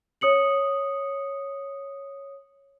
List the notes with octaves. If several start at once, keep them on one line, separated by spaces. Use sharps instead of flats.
C#5 D#6 C#7 F#7